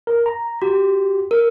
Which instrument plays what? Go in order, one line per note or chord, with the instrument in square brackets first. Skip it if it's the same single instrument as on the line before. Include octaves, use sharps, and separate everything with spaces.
[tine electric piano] A#4
A#5
[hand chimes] F#4 [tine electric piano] G4
[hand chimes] A#4